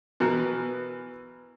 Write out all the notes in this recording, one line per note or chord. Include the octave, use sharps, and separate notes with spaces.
B2 E3 B3 A#4